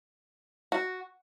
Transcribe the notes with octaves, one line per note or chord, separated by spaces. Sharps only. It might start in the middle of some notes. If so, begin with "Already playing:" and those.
F#4